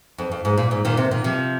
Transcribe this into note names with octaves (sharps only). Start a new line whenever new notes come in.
F2
F2
G#2
A#2
G#2
A#2 D#3
C3
A#2 D#3
C3 F3